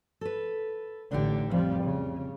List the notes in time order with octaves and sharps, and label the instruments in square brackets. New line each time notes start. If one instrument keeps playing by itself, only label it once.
[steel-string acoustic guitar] A4 B4
[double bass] A1 D3 [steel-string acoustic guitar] D4 D#4 G4
[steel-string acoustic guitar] F2 [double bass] F3 G3
[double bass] C#3